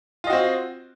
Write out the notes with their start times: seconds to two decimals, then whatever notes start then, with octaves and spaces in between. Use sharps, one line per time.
0.24 F4
0.27 D#5
0.30 F#4
0.33 C4